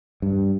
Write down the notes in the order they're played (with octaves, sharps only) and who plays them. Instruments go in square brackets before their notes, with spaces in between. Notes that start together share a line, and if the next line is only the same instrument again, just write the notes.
[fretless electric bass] G2